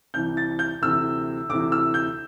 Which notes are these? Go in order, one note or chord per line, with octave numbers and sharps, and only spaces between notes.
C2 C3 E3 G6
A6
G6
D2 C3 E3 E6
D2 C3 E3 D6
E6
G6